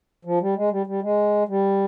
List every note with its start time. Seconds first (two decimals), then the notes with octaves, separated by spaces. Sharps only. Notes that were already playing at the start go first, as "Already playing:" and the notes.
0.25 F3
0.41 G3
0.56 G#3
0.71 G3
0.87 G3
1.02 G#3
1.48 G3